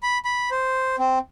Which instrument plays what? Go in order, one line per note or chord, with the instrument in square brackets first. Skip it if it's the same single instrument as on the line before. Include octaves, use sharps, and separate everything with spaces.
[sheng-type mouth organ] B5
B5
C5
C4